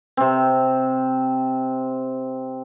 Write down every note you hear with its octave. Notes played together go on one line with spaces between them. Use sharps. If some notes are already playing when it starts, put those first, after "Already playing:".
C3 C4